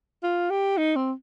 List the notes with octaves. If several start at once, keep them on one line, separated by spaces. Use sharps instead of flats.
F4
G4
D#4
C4